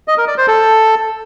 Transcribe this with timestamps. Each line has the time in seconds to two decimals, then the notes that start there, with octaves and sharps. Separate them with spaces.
0.08 D#5
0.18 A#4
0.28 D5
0.38 C5
0.48 A4